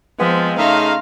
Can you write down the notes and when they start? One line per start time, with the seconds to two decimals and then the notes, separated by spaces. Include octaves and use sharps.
0.19 F3 G#3 B3 C4
0.58 C#3 A3 D#4 A#4 F5 C6